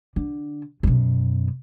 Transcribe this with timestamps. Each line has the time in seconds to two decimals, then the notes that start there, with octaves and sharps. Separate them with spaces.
0.16 D3
0.83 F#2 B2